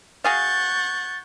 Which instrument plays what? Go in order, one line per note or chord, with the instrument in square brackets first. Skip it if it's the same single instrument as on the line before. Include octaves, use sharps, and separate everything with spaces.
[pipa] F#4 G#4 F5 [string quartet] F#5 C#6 G6 [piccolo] A6